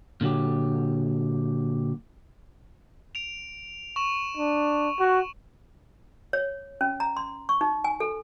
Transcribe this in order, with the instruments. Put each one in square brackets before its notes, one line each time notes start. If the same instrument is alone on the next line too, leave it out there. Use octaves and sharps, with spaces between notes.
[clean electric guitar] A#2 D3 F#3 G4
[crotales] D7 F7
C#6 E7 F#7
[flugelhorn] D4
F#4
[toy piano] C#5
C#4
A#5
C6
C#6
D#4
G#5
A4